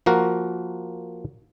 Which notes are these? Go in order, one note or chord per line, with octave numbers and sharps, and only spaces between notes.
F3 A#3 F#4 A#4